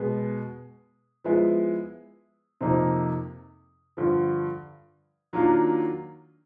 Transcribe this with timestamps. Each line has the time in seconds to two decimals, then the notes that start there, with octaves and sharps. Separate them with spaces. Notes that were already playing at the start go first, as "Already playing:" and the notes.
Already playing: B2 G#3 B3
1.24 F3 G#3 B3 E4
2.61 F2 C3 F3 A#3 D#4
3.97 G2 D3 F3
5.33 D#3 F#3 A#3 D4 F4